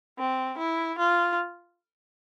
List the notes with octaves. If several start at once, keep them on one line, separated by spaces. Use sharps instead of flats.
C4
E4
F4